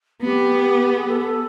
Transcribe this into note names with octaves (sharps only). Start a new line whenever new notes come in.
B3 G4
G#4
A4
A4